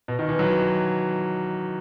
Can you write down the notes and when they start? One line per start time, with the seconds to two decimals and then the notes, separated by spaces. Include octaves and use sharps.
0.08 B2
0.19 D#3
0.29 E3
0.39 F#3